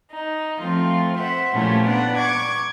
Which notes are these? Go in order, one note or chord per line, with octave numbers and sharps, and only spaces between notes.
D#4
F3 A3 C4 F4
C5 E5 F#5
A#2 F3 A3 C#4 E4 G4
B3 D4 B4 D5 F#5
C#6 D6 G#6